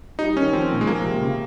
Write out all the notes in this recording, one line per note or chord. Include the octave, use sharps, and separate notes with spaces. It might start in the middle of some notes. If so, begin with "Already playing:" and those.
G3 D#4
D#3 C#4
F3 C4
A#2
G#3
F3 A#3
C3
C#3